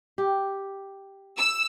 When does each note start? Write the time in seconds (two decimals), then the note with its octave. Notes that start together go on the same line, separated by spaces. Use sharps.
0.18 G4
1.37 E6